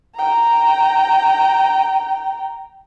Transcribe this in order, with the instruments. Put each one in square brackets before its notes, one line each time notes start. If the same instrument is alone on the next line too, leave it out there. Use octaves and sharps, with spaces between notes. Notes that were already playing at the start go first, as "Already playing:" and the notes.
[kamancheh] G5 A#5